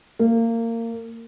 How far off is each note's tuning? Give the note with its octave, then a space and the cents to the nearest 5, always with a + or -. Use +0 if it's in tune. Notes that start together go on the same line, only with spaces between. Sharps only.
A#3 -25